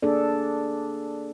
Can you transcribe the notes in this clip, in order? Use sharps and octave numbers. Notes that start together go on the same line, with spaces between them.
A#3 D4 G#4 A4 D5